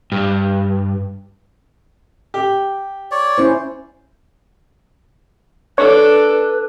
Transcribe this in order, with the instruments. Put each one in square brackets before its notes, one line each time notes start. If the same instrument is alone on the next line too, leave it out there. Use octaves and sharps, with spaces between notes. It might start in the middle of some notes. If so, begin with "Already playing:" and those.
[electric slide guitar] G2
[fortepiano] G4
[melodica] C#5 D5
[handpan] C#4 E4 C5
[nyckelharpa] D4 A4 [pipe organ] B4 [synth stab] C#5